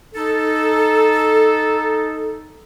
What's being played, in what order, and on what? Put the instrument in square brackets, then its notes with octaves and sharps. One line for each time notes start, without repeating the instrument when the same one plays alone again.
[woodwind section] D#4 A4